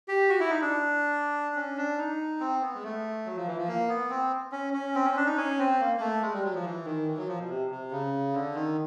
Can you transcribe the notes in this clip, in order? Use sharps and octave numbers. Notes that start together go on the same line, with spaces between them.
G4
F#4
E4
D#4
D4
C#4
D4
D#4
C4
B3
G#3
A3
F#3
F3
E3
F3
A#3
B3
C4
C#4
C#4
C4
C#4
D4
D#4
C#4
C4
A#3
A#3
A3
G#3
G3
F#3
F3
E3
D#3
E3
F#3
F3
B2
C3
C3
C#3
D3
D#3